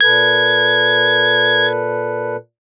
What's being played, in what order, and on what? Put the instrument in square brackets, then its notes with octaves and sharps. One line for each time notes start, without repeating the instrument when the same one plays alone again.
[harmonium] A#2 A4 B4 [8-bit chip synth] G#6